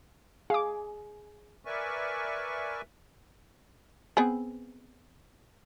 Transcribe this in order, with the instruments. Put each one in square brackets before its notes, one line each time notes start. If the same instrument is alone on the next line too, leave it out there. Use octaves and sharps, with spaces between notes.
[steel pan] G#4 [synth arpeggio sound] F5 D6
[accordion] A#4 B4 D5 E5 G#5 C#6
[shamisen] B3 C4 G#4